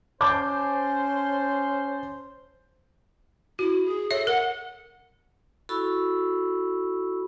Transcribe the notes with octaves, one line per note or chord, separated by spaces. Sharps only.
C#4 C5 A5 D6 G6
E4 F#4
G#4
A4 C#5 E5
A#4 F#5
E4 F#4 A4 B5 C#6 E6